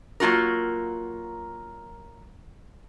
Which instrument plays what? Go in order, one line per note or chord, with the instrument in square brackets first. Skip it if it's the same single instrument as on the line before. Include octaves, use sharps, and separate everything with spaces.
[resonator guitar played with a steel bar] F#3 A#3 F4 F#4 A#4